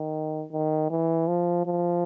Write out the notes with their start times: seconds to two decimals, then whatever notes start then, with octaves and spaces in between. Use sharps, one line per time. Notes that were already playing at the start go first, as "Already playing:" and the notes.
Already playing: D#3
0.52 D#3
0.90 E3
1.28 F3
1.66 F3